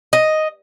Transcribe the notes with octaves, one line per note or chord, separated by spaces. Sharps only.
D#5